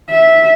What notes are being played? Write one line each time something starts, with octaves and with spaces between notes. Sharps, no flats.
E5